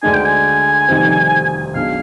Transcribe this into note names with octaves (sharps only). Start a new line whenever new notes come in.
D2 D3 G#3 D4 G#5
G5
G#5
F1 F2 D#3 G3 C4
B1 B2 G#3 D4 F5